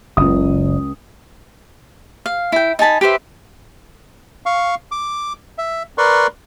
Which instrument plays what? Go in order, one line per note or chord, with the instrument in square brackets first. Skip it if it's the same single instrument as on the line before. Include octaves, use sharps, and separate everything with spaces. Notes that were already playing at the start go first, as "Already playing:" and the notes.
[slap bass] F#1 [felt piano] C#2 D#6
[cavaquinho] F5
E4 G5
D#4 G#5 A5 B5
G4 B4 C5 E5
[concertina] F5 C#6
D6
E5
A#4 B4 D5 C6 C#6